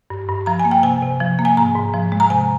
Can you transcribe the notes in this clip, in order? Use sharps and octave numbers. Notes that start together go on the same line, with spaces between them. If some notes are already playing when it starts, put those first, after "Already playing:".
G2
G2
F3 A#5
G#5
A#3
G5
C3 G#5
C3
F3
A#3
G#5
G#2 A#5
G#2
F3
G#3
A#5
C3 G#5